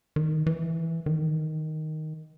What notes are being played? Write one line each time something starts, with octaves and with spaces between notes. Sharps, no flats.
D#3
E3
D#3